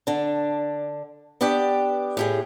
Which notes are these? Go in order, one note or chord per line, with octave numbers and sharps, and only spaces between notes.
D3 D4
B3 D4 G4 D5 G5
A2 G4 G#4